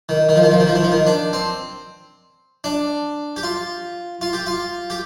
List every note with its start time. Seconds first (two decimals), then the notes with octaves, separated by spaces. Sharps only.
0.09 D#3
0.29 D#3
0.36 F3
0.43 D#3
0.52 F3
0.60 D#3
0.68 F3
0.76 D#3
0.83 F3
0.92 D#3
1.07 D4
1.33 C4
2.64 D4
3.36 G4
3.43 F4
4.21 F4
4.33 G4
4.46 F4
4.90 G4